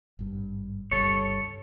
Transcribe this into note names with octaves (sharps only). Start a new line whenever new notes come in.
G#1 G2
G1 C#2 G2 A4 C#5